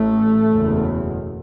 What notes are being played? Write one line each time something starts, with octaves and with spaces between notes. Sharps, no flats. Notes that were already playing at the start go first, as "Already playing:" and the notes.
Already playing: A1 A2 A3
F#1 E2 B2